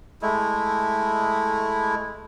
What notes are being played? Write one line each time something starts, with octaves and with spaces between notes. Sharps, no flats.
G#3 A3 E4